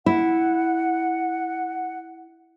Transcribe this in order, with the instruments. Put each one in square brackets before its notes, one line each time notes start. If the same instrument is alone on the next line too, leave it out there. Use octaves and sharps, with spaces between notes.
[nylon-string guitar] E4 [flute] F#5